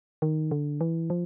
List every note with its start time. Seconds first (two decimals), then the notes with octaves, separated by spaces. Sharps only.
0.22 D#3
0.51 D3
0.81 E3
1.10 F3